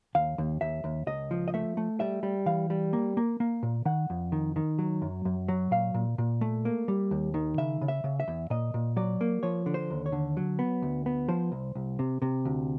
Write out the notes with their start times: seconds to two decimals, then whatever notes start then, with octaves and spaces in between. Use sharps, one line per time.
0.15 D#2 F5
0.38 D#2
0.61 D#2 E5
0.84 D#2
1.07 C#2 D#5
1.31 F3
1.48 D#5
1.54 A3 E5
1.77 A3
2.00 G3 E5
2.23 G3
2.46 E3 F5
2.70 G3
2.93 A#3
3.17 A#3
3.40 A#3
3.63 A#2
3.85 D#3 F#5
4.10 F2
4.32 D#3
4.56 D#3
4.79 F#3
5.02 F#2
5.25 F#2
5.48 F#3
5.71 A#2 F5
5.94 A#2
6.18 A#2
6.41 A3
6.65 A#3
6.88 G3
7.11 D#2
7.34 D#3
7.58 C#3 E5
7.81 C#3
7.88 E5
8.04 C#3
8.20 E5
8.28 E2
8.50 A#2 D#5
8.74 A#2
8.96 F#3 D5
9.21 A#3
9.43 F3 C#5
9.66 D3
9.74 C5
9.90 D#2
10.06 C#5
10.12 D3
10.37 F#3
10.59 B3
10.82 D2
11.06 B3
11.28 F3 C5
11.52 C2
11.75 C2
11.99 C3
12.22 C3
12.45 D2